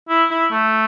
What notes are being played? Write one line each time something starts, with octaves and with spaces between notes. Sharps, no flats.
E4
E4
A3